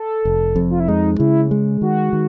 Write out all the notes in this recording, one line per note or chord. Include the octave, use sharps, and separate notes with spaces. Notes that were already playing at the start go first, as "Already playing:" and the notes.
Already playing: A4
F1
F2
F4
E4
G#3 D#4
C#3 E4
G#3
D#3 F#4
D#3